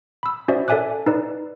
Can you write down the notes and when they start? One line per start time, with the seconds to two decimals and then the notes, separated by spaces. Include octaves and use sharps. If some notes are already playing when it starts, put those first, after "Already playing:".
0.23 B5 E6
0.48 C#4 F#4 C5 D5 E5
0.68 A4 D5 E5 G#5 D6 F#6
1.06 D#4 B4 D5